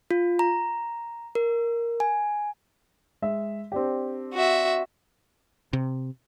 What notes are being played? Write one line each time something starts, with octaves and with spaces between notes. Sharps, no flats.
F4
A#5
A#4
G#5
G#3 E5
C4 D4 G4
F#4 E5
C3